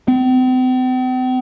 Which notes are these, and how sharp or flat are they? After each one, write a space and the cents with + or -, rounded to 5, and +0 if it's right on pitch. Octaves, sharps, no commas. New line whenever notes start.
C4 -45